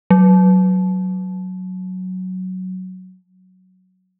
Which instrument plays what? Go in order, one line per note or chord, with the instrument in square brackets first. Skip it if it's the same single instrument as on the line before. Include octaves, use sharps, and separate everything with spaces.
[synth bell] F#3